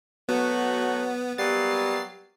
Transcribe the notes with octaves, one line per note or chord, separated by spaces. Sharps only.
F#3 A3 B3 F#4
F#3 G3 A#3 B3 A6 C7